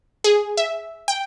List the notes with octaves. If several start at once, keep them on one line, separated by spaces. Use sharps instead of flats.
G#4
E5
G5